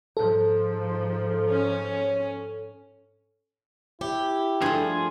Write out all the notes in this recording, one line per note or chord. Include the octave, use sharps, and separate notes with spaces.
G#2 F3 A4
C#4
E4 G4
G2 F3 A3 G#4